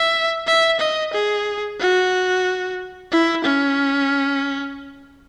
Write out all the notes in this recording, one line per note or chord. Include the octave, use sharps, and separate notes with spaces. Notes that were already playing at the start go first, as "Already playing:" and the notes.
Already playing: E5
E5
D#5
G#4
F#4
E4
C#4